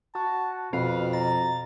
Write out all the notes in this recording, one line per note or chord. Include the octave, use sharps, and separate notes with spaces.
F#4 A5
F2 B2 B4 F5
A#5 A6